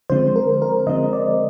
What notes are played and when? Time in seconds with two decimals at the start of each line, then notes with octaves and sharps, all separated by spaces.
0.10 D3 F3 G#3 C4 C5
0.36 A#4
0.62 A#4
0.87 D3 F3 G#3 C4 D#5
1.13 D5